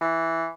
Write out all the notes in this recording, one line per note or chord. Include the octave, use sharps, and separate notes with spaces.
E3